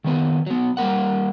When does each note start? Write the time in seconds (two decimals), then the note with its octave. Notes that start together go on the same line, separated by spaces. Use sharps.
0.04 D#3 A#3 B3 B4
0.46 F#3 B3
0.77 G3 A#3 A#4 F#5